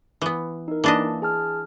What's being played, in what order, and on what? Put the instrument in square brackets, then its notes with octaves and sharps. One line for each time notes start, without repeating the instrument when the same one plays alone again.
[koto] E3 B3
[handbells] D#4 A#4
[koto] E3 D4 D#5 [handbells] A#3 A5
[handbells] G#4 A5 F6